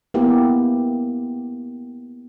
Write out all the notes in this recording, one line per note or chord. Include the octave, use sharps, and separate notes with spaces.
A#3 B3 E4 G4